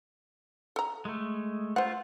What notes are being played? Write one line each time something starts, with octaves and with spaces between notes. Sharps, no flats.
A4 A#5
G#3 A3
A3 F4 C5 F#5